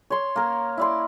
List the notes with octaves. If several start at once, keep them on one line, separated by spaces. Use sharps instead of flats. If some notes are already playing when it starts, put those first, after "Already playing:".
C#5 C6
A#3 A#4
E4 D5 C6